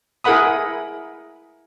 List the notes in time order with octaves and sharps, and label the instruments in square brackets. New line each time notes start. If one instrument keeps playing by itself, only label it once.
[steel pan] E4 G#4 A#4 F#5 B5 D#6